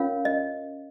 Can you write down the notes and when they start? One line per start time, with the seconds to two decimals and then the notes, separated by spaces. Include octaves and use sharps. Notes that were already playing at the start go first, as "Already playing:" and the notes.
Already playing: C#4 F4 A#4 C#5 F5
0.25 D#5